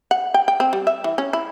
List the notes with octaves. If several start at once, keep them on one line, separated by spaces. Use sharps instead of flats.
F#5
G5
G5
C4
G3
E5
E3
C#4
E4